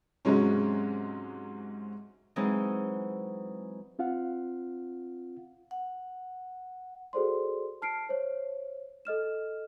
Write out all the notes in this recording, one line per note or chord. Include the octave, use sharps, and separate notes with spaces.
G#2 C3 F#3 G#3 C#4
E3 F#3 G#3 C4 D#4
C4 F4 F5 F#5
F#5
F#4 G#4 A4 C5 D5 C6
A5 F6 C7 D7
C5 C#5
A4 D#5 F6 E7